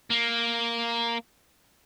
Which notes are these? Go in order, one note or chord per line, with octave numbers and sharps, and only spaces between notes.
A#3